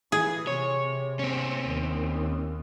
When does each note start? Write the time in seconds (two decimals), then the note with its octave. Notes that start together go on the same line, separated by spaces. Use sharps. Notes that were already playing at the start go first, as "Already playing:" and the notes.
0.12 E3 G#4
0.47 C3 C#5
1.19 C4 C#4
1.65 D#2